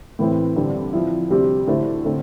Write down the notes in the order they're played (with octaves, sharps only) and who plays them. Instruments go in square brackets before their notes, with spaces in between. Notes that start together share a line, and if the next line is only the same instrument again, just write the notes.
[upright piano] A2 E3 A3 C4 E4
G2 D3 G3 C4
F3 C4 E4
D2 C3 G3 C4 G4
D3 A3 E4 A4 C5
D3 A3 C4